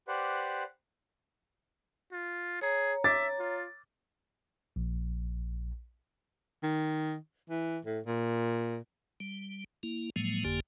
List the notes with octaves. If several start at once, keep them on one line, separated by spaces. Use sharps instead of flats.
G4 B4 C5 D5 F#5
F4
G#4 C#5 A#5
E5 D6 A6
F4
A#1
D#3
E3
A2
A#2
G3
A#3 E4
A2 F3 F#3 G#3 A#3
G1 F2 D3 A#3 G4 G#5